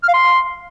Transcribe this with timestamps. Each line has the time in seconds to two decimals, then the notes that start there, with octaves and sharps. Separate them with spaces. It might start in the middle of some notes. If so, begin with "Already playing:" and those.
0.03 F6
0.09 F5
0.14 C6